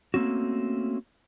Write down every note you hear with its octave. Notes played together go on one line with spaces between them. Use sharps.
A3 A#3 C4 C#4 F#4